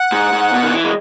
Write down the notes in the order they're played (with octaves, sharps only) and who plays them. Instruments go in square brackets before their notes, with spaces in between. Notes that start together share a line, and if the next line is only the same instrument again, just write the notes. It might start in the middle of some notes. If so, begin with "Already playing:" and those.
Already playing: [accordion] F#5
[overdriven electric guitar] G#2
G#2
B2
D#3
E3
G#3